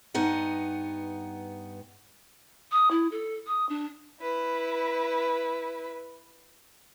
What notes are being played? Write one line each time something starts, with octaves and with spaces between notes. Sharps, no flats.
G2 B3 D#4 F#5
D#6
E4
A4
D#6
D4
E4 B4